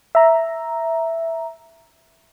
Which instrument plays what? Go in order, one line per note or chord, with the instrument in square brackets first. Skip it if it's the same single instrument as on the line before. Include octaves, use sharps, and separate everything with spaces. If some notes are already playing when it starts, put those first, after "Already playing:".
[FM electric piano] E5 A#5